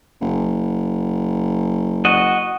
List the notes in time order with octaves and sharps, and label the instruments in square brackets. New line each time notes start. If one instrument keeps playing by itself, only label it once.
[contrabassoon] F#1
[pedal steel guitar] F#4 D#5